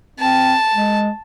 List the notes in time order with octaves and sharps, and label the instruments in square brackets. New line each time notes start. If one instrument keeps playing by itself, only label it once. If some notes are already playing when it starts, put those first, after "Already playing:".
[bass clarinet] C4 [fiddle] A5
[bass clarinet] G#3